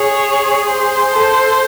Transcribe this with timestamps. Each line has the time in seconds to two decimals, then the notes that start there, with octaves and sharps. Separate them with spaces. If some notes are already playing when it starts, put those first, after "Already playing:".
Already playing: G#4 C#5
0.66 C5
1.13 A4